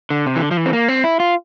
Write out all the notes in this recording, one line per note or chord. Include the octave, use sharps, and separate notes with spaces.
D3
C3
E3
D3
F3
E3
C4
A#3
C4
E4
F4